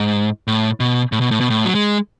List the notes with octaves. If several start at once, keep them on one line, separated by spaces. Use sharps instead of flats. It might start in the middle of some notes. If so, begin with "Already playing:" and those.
Already playing: G#2
A2
B2
A2
B2
A2
B2
A2
F#3
G#3